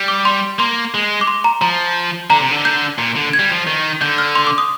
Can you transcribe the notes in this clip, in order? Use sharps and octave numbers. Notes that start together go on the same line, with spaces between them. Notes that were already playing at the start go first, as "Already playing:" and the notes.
Already playing: G3
D6
C6
A#3 C6
G#3
D6
C6
A#5
F3 A#5
D3 A#5
C3
D3
G6
A#2
D3
G#6
G3
F3
D#3
D3 G6
F6
C6
D6
D#6